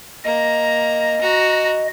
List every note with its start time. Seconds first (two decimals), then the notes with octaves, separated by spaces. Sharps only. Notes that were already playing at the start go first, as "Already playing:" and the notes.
0.24 A#3 D#5 A#5
1.20 F#4 A#5